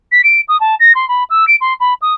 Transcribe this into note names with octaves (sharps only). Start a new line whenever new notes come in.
B6
D7
D#6
A5
A#6
C6
B5
E6
D7
C6
B5
D#6